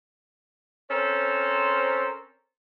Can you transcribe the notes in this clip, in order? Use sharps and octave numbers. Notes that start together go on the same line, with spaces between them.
C4 C#4 A4 A#4 C5